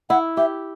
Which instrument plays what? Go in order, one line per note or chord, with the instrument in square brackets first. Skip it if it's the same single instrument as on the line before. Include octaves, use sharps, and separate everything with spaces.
[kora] E4 [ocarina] F#5
[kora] G4 [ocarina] E5